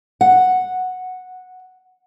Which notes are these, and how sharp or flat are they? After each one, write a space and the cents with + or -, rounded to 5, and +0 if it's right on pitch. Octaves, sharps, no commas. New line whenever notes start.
F#5 -5